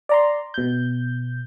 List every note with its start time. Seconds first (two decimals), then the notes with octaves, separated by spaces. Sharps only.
0.09 D5 A#5 C6
0.54 B2 G6